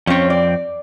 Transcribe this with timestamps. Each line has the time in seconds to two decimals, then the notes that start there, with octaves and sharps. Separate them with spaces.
0.07 F2 C4 C#4 C#5
0.30 D5